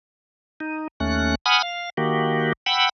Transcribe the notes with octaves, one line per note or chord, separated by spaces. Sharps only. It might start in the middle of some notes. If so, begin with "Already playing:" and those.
D#4
D#2 A3 C#4 F#6
F#5 G#5 B5 D#6 F6
F5
D#3 A#3 F#4 G4
F#5 G5 B5 E6